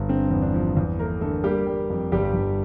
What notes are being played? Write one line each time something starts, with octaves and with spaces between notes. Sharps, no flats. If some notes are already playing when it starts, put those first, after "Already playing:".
Already playing: G1
D3 C4
E2
D4
F3
E2
A3 A#3 A#4
D3 A3 A4
G3 A#3 G4
G3
F2
G1 G3 G4
G1